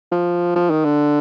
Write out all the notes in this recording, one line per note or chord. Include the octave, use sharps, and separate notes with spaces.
F3
F3
D#3
D3